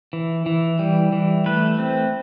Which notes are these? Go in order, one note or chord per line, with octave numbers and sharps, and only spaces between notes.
E3
E3
G3
E3
A3 B4
C4